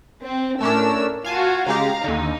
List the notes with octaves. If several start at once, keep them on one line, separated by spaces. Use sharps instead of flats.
C4
A2 A3 C#4 D4 A#4 E6
F4 F#4 F5 G#5 A5
C#3 G#3 G4 F5 A#5
D#2 D3 D#4